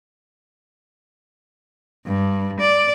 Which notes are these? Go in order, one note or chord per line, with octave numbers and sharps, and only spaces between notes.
G2
D5